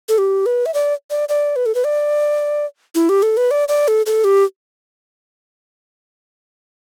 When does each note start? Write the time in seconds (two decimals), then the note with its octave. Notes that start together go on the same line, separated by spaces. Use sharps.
0.09 A4
0.18 G4
0.46 B4
0.66 E5
0.74 D5
1.10 D5
1.29 D5
1.56 B4
1.66 A4
1.75 B4
1.84 D5
2.95 E4
3.09 G4
3.23 A4
3.37 B4
3.51 D5
3.68 D5
3.88 A4
4.06 A4
4.24 G4